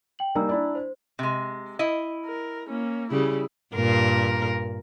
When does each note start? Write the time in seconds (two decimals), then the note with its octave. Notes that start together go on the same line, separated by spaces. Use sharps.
0.19 G5 F#7
0.35 G3 A#3 D#4 G#5 A#5 E6
0.49 D4 E4 D5
0.75 C5
1.19 C3 G#3
1.79 E4 D#5
2.26 A#4
2.69 A#3 C#4
3.11 C#3 G3 E4 G#4
3.74 G2 A#2 A#4